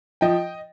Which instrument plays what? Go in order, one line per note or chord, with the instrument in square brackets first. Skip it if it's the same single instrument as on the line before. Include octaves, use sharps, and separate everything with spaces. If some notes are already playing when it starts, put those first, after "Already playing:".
[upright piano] F3 D#5 G5